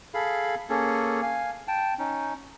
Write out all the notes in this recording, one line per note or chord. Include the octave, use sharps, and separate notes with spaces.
G#4 A4 F5 B5
A#3 C#4 G#4 A4
F5 G#5
G5 A5
C#4 D#4